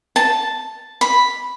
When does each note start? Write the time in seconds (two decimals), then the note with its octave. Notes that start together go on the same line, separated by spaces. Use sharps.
0.16 A5
1.01 B5